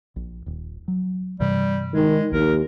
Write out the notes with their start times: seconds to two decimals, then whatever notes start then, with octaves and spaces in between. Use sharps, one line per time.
0.16 A#1
0.46 D#1
0.88 F#3
1.40 G2 C3 E3 G3
1.94 D#3 G#3
2.32 A#1 D#2 A#4